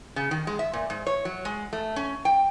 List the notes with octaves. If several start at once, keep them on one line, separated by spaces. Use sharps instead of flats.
C#3
D#3
G#3
E5
A#2
G#2
C#5
F#3
G#3
A3
C#4
G5